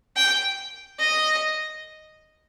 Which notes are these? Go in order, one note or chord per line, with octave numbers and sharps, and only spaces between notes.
G5
D#5